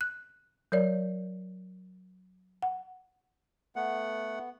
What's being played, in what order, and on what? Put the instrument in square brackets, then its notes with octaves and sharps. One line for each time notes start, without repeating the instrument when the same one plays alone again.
[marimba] F#6
F#3 A#4 C#5 D5
F#5
[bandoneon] A3 F#5 [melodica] B3